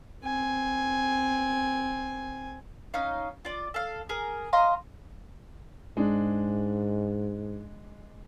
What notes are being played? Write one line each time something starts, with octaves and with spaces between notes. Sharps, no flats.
C4 G#5
C#4 D#4 F5
F4 D5
A4 F5
G#4 A#4
D#5 F5 A#5 C6
G#2 G#3 D4